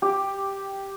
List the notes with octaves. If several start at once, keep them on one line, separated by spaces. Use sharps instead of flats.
G4